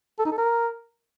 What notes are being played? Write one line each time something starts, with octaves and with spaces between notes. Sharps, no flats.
A4
D#4
A4
A#4